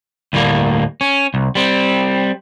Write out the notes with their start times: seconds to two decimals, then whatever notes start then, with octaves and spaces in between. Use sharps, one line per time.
0.33 D2 A2 G3 A#3
1.01 C#4
1.34 C2
1.55 G3 C4